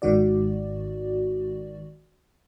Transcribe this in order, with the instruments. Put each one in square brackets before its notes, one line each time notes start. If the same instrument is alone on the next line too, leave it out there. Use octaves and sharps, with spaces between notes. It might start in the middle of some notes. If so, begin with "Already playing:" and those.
[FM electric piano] G#1 G#2 D#3 F#4 D5